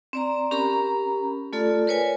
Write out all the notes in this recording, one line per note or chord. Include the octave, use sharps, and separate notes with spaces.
C4 D5 A#5
C#4 G4 A#4 A#5 B5
A3 F4 A4 D5
A#4 B4 C#5 D5 G#5